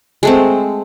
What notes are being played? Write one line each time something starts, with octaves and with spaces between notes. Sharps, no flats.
G#3 A3 C4